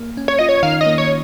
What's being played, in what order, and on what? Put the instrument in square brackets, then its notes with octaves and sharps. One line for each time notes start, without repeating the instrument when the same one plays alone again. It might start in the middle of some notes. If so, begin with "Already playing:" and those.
Already playing: [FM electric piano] A#3
C#4
[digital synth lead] C#5
[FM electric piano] F4 [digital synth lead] D#5
[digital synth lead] C#5
[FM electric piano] D#3 [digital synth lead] F5
[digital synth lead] D#5
[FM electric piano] A#3
[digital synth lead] C#5